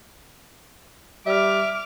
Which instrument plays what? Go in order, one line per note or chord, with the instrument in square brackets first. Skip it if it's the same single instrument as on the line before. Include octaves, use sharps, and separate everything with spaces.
[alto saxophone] G3 [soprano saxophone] E5 [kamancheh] D6 F6